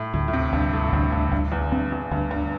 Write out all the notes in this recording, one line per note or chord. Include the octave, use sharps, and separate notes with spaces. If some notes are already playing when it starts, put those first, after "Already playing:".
Already playing: A2
D2 A2
A2
C3
D2 G2
A2
A2
D2 G2
G2
D2 G2
E2
G2 C4
E2
D2 G2
G2